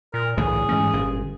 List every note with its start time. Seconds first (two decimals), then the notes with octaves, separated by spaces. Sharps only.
0.14 A#2 A#4
0.37 C2 A2 D3 E3 G#4
0.69 G#2 E3 A3 C#4
0.93 G1 A#2